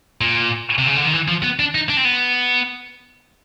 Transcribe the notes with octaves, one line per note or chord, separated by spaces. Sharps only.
A#2
C3
C#3
D3
D#3
E3
F3
B3
D4
D#4
D4
C4
B3